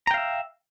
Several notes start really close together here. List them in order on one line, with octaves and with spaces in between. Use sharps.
A#5 G5 F5 E5